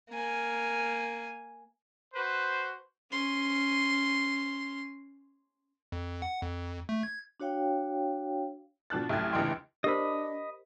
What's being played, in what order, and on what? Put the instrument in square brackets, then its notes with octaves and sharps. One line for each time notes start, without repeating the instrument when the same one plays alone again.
[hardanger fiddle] A#3 G#5
[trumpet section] F#4 B4 C5
[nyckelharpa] C#4 C6
[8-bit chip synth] F2
F#5
F2
A3
G#6
[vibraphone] D4 F#4 C#5 F5 G5
[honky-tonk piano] B2 F3 D4 F#6 A6
C2 F#2 A3 G4 G#6 A6
F1 C#2 E3 D4 G5 C6
[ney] D4 [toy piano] G4 A#4 C5 [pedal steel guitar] D#5 B5